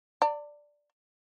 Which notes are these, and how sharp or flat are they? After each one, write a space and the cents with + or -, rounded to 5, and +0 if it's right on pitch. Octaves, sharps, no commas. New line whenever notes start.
D5 +0 A5 +45